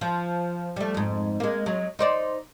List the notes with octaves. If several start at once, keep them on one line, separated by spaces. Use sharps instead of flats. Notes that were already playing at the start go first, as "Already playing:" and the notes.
F3
G3 A3
F2 G#2
G#3 A#3
F#3 G#3
D#4 C5 D5